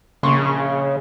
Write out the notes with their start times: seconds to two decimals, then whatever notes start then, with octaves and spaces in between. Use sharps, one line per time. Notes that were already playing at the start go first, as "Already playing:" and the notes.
0.23 A#1 C#3 C6 C#6